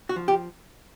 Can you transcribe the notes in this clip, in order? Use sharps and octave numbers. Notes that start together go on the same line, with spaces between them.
F#4
F3
G4